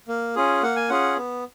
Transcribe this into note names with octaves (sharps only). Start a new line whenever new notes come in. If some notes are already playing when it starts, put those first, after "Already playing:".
A#3
C#4 F4 G#4
A#3 F#5
G#5
C#4 F4 G#4 F#5
B3